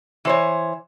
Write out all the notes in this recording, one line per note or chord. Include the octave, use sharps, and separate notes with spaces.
E3 C5 C#5